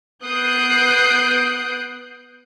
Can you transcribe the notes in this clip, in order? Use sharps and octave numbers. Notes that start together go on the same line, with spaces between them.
B3 D#6 F#6 G6 C7 D7